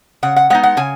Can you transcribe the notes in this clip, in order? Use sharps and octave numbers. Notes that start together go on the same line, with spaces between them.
C#3 F#5
F#5
G#3 B3 D#4 F#5
F#5
C#3 G#5